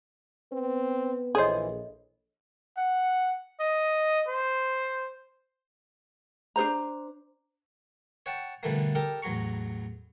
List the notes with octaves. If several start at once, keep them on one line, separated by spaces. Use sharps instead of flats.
B3 C4 B4
A#1 E3 G#4 A4 C5 C#5 D#5
F#5
D#5
C5
D4 A4 C5 A#5
C#5 F#5 G5 A5
B2 D3 E3 G3 A3 A#3
G4 A4 A#4 G5
A1 E2 F#3 A#5 C#6